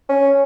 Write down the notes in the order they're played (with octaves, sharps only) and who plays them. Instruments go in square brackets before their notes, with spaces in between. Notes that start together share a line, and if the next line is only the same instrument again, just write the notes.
[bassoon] C#4